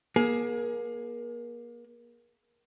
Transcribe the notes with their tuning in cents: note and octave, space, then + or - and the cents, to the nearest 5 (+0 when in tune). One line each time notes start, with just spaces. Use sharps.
A#3 +35 G#4 +20